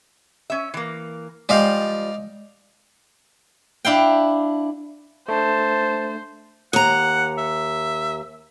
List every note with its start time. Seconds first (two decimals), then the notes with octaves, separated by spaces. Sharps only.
0.50 C#4 E5
0.74 E3 A#3
1.49 F3 G3 G#3 D5 D#5 F5
3.85 D4 E4 F5 G5
5.28 A3 D4 C5 A5
6.73 D#2 F#5 A#5
7.38 E5